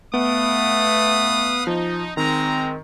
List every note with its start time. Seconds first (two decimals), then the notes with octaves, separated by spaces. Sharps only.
0.14 A3 B3 B4 F5 D#6
1.67 F3 D#4
2.17 D#3 G#3 C4 A#5